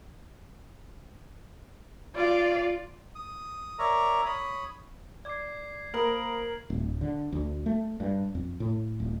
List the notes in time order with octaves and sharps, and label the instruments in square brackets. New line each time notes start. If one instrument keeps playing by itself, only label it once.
[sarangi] F4 [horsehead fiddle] D5 F5
[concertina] D#6
A#4 C#5 D5 E5 A#5
C#5 B5 D#6
[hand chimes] D5 D6 [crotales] G#6 C7
[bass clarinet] A#3 [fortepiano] A#4 [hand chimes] C5 B5 D#6 [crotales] F#7
[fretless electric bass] D1
D3
D2
A3
G2
F2
A2
D1